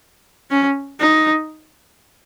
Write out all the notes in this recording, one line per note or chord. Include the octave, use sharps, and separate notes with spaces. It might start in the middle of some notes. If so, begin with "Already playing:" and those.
C#4
D#4